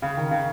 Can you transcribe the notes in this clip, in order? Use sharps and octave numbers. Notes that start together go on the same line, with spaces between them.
C#3
D#3
C#3